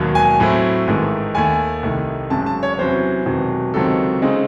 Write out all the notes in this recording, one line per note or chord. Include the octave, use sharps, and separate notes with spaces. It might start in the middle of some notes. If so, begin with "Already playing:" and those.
Already playing: E1 D#2 D#3 F#3
G#5
A2 F#3 A3 C4 E4
A1 G#2 D#3 A3
D#2 D#3 A3 G#5
C2 C3 D#3 A3
G#1 F#2 C#3 A5
A5
C#5
C#5
E2 C3 F#3 C#4 E4 C5
E1 E2 C3 D#3 F#3
C#2 C3 D#3 F#3 C4 A4
C#3 G#3 C4 D#4